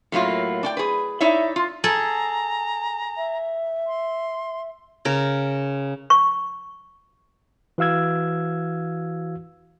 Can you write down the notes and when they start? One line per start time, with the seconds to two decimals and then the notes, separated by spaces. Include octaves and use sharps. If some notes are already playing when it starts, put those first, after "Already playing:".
0.12 A2 F#3 A#3 F4
0.63 D4 D5 G5
0.77 G#4 B4
1.20 D#4 E4 C#5 D5 E5
1.56 F4
1.84 G#4 A4 A#5
3.17 E5
3.87 C6
5.05 C#3 A#4
6.10 C#6
7.78 E3 F#4 F5 E6 G#6